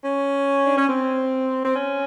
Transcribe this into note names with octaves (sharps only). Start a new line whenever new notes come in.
C#4
D4
C#4
C4
C4
C#4